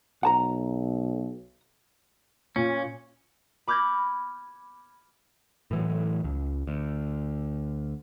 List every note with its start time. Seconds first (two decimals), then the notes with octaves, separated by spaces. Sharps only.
0.23 B1 F#5 A5 A#5
2.56 A#2 C#4
3.67 B5 D6 F6 G6 G#6 A#6
5.71 A2 E3 F#3
6.24 C#2
6.67 D2